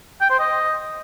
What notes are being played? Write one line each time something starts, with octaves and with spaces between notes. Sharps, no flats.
G5
C5
D#5